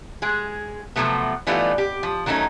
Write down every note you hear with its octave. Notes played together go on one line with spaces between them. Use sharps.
G#3 G#4
C3 F3 F#3 A3 B3
E3 G3 A3 B3 D#4 F4
G4
F3
D#3 F#3 A3 C#4 D#4